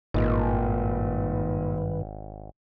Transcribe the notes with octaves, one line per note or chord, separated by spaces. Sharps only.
G#1 G2 A#2 D#3 B4 D#5